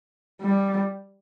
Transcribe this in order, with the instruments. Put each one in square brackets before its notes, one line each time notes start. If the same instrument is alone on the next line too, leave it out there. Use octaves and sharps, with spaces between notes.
[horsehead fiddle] G3